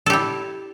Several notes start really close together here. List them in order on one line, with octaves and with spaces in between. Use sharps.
A4 G4 E4